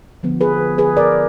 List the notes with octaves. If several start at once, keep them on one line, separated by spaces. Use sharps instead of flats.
D3 F3 B3
G#4 B4
G#4 B4
A#4 D5